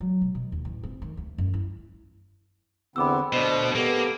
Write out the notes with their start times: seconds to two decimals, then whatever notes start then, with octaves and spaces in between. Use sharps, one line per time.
0.01 F#3
0.22 B2
0.35 B2
0.52 D#2
0.65 A1
0.83 C4
1.02 D#3
1.17 D2
1.38 F#2
1.54 E4
2.96 E2 D3 B3 C4 B5 D6 E6
3.33 D2 B2 D4 C5 D#5
3.75 A#3 B3 G4 A4